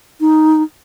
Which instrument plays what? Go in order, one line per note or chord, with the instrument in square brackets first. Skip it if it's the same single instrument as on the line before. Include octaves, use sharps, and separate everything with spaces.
[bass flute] D#4